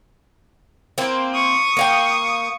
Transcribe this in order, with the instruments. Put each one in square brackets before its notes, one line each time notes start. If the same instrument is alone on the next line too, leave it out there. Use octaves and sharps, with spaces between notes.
[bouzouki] A#3 C4 E4
[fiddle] C#6 D#6
[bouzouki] A#3 F5 G5